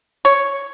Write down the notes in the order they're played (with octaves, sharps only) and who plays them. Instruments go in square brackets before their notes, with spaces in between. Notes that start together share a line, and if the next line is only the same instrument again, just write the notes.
[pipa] C#5